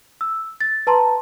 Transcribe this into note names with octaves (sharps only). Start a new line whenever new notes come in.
E6
A6
B4 A5 A#5 C6